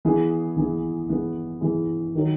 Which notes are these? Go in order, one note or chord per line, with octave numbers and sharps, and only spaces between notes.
E3 B3 E4 G#4
E3 B3 E4 G#4
E3 B3 E4 G#4
E3 B3 E4 G#4
D#3 F#3